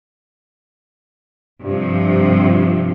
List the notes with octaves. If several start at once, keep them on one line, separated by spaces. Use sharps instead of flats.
G2 C3 F3